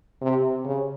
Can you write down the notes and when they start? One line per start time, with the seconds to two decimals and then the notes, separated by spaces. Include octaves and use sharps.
0.22 C3
0.65 C#3